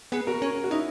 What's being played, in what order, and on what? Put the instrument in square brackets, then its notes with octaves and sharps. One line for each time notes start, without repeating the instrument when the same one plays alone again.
[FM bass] B3 [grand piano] G#4 B4
[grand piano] F#4 A#4
[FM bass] C#4
[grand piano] F#4
[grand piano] C#4 E4 [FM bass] D#4